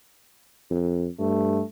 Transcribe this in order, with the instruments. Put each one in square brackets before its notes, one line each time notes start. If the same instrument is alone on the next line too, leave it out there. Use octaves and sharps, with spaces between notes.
[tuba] F2
[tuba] G2 [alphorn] A3